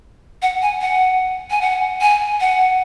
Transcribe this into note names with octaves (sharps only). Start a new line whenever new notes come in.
F#5
G#5
F#5
G#5
F#5
G#5
F#5